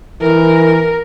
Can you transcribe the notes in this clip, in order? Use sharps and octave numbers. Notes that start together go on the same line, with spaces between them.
E3 A#4